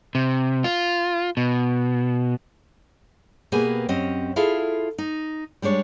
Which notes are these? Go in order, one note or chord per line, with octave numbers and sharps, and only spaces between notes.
C3
F4
B2
B2 A#3 G4 G#4 B4 G#5
F#2 C4 C#4 G4 D#5
E4 F4 G#4 A4 E5 F5
D#4
G3 G#3 D4 C#5